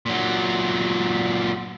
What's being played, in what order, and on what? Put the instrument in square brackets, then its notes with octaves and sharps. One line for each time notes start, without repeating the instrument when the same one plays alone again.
[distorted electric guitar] A#2 F#3